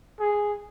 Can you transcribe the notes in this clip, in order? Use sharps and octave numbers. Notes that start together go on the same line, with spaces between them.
G#4